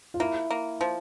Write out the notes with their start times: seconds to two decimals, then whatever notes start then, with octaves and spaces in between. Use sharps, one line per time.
0.14 F4
0.20 A#3 E4
0.50 A#3
0.81 F3